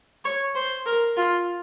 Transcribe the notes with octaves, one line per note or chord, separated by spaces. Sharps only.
C#5
C5
A#4
F4